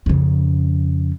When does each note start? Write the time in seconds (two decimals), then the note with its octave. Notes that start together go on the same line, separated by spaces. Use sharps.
0.06 F2 C#3